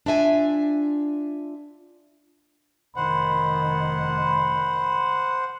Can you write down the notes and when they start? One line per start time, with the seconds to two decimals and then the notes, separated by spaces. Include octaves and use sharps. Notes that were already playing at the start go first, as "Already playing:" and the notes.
0.06 D4 F4 E5 G#5
2.96 F1 D#3 C5 F#5 B5